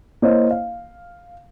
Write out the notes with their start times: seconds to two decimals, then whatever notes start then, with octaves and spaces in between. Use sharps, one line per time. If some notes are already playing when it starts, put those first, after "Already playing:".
0.22 A#3 E4 C5 C#5 D#5
0.51 F5